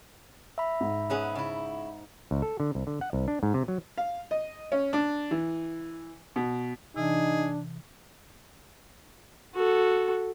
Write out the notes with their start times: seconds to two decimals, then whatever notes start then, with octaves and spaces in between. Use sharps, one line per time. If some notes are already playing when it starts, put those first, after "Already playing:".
0.58 E5 B5
0.80 G#2
1.10 B3 C#4 G#4
1.35 C#3 E4
2.31 C#2
2.42 A4
2.60 D3
2.75 C2
2.87 D3
3.01 F#5
3.13 C2
3.28 D4
3.43 G#2
3.54 C3
3.68 F#3
3.98 F5
4.31 D#5
4.72 C#4
4.93 D4
5.31 E3
6.36 B2
6.96 C3 E3 D4 D#4 G#4
9.55 F#4 A4